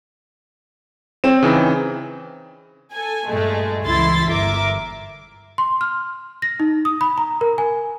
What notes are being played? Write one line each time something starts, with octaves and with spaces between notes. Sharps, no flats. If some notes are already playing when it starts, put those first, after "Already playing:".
C4 C#5 E7
C#3 E3 D#4
A4 G#5
G2 A#2 G#3 A3
C#2 E3 E4 C6 A6 B6
G1 A#4 E5 D6
C6
F6
A#6
D#4
D#6
B5
A#5
A#4
G#5